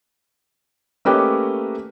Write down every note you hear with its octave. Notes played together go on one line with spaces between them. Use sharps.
A3 A#3 C#4 G4 B4 D#5